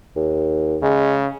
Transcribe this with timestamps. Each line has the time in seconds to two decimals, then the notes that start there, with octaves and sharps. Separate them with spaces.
0.16 D#2
0.83 C#3 G#3